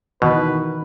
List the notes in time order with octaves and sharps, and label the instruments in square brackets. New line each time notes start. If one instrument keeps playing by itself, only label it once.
[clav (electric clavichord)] B2 [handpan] D#3 E3 [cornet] B4